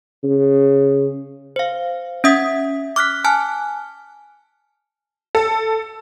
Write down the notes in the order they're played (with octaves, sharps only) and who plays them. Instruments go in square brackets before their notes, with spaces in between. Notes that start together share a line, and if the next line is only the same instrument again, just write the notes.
[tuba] C#3
[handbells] C5 F5
C#4 E5 D#6 G#6 B6
D6 F6 F#6 B6
G#5 A5 F6 F#6
[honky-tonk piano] A4